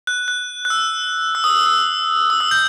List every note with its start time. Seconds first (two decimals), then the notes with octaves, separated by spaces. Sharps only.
0.07 F#6
0.28 F#6
0.65 F#6
0.70 E6
1.35 E6
1.44 D#6
1.50 E6
1.66 E6
2.30 D#6
2.41 E6
2.51 G6